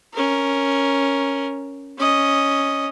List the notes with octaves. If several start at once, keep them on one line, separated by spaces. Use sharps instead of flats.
C#4 A#4
C#4 D#5